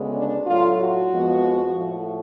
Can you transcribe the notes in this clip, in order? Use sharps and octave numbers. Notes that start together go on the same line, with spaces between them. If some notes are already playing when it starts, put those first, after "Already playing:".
Already playing: D2 C#3 G#3 B3
D4
A2 F#3 A3 F4
F#4
F2 F3 G#3 B3
A2 F3 A3